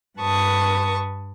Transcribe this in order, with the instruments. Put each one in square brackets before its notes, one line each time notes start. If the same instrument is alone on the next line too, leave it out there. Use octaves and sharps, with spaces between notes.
[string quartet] G2 B4 A5 C#6 D#6